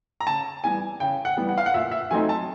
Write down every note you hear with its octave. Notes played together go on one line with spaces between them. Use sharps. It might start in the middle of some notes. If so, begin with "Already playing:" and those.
A#5
C#3 A5
E3 G3 B3 G#5
C#3 G5
F#5
E3 G3 B3
F#5
F5
F#5
A#2 E5
E5
F#3 A3 C4 D#4 G#5
A5